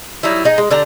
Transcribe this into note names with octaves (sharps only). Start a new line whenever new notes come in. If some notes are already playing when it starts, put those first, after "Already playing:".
F#3 G3 D#4 E4
D#4 G#4
G#3
D3 D4 G4 A#5